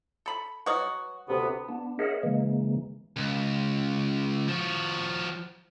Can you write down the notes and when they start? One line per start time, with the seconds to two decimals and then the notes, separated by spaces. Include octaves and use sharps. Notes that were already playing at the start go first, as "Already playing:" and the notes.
0.26 A4 B5
0.66 F#3 F#4 B4 D#5 D#6
1.28 D2 C3 B3
1.69 B3 D4
1.99 G#4 A#4 C#5 D#5 E5 F#5
2.23 C#3 E3 G#3 A#3
3.16 C#2
4.48 F3 F#4